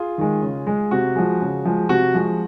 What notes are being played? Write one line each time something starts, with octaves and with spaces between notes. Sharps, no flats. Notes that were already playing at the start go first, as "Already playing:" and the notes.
Already playing: F4 G#4
D#3 G#3
C#3
G#3
C3 F#4
F3 G#3
C#3
F3 G#3
C3 F#4
F3 G#3